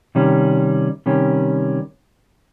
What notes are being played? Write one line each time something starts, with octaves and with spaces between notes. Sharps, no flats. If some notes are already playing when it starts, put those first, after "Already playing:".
C3 D#3 G3 C#4
C3 D#3 G3 C#4